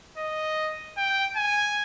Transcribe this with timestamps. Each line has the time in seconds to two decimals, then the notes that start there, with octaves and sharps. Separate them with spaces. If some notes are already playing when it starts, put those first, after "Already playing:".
0.17 D#5
0.97 G5
1.36 G#5